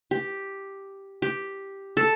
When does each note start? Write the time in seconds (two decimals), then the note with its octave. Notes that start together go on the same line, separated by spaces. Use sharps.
0.11 G4
1.22 G4
1.97 A4